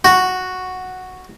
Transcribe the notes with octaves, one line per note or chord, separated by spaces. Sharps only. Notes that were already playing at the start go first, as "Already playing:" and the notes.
F#4